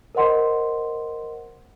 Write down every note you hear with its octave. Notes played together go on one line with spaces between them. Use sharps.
A#4 C5 D#5 F#5 C6